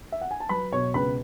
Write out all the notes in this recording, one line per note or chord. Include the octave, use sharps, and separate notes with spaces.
E5
F#5
G#5
A5
F#3 B4 B5
B2 C#5 C#6
C#2 B4 B5